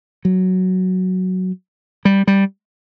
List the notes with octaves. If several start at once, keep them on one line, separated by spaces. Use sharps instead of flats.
F#3
G3
G3